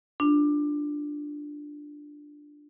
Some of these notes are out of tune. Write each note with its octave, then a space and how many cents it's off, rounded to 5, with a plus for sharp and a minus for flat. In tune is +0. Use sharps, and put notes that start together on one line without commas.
D4 +5 F4 +0